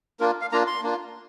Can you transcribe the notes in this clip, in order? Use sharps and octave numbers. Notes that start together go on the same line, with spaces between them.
A#3 D4 F4 A#4
F5
A#3 D4 F4 A#5
C6
A#3 D4 F4